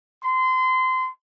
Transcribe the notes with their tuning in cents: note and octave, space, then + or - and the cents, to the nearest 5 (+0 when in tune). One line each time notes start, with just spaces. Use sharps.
C6 -25